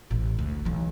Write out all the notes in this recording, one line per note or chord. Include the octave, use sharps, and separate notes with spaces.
A1 C3
D2
B1 E3